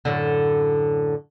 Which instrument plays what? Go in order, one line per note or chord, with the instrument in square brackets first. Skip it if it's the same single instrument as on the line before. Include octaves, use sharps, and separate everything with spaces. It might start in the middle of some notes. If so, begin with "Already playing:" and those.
[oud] F#2 A2 D3